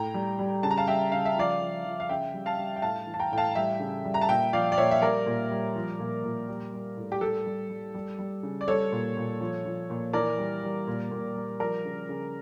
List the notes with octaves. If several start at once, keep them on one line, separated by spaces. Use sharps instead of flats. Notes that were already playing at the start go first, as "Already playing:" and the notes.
Already playing: A2 G5 A#5
G3
G3
C#3 A5
A#5
F5 A5
G3 E5 G5
C#3 F5
E5
F3 D5 F5
F3
F3
F5
C#3 E5 G5
G3
F5 A5
G3
G5
A2 F5 A5
E3
A5
G5 A#5
A2 G5
F5 A5
G3 E5 G5
C#3
G3
A#5
A5
A#2 E5 G5
F3 D5 F5
D5
A#2 C#5 E5
E5
G3 A#4 D5
A#2
G3
F3
A#2
A#2
G3
G3
A2
G4
G3 A4
G3
G3
G3
G3
C#3
D5
G3 A4 C#5
A#2
A#2
F3
F3
A#2
E3 A#4 D5
G3
G3
A#2
A#2
G3
F3 A#4 D5
C#3
C#3